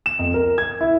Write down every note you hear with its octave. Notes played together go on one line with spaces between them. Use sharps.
E7
F2
A#4
G#6
E4